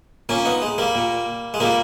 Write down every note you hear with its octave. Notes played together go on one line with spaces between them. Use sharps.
A#2 A#3 C#4
B3 D#4
G#3
G3 A#3
A#2
G#3
A#2 G3 A#3